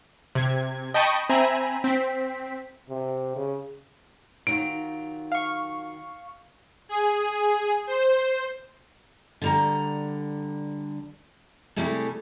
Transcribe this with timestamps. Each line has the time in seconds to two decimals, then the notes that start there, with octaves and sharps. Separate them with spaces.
0.35 C3 G#6
0.94 D#5 G5 A5 B5 C#6 D#6
1.29 C4 E5 G#5 A#5 B5
1.84 C4 B6
2.89 C3
3.36 C#3
4.47 D#3 F#3 F4 D7
5.32 F5 C#6
6.89 G#4
7.87 C5
9.42 D3 G3 A#5
11.76 C3 G3 A3 E4 G#4 A4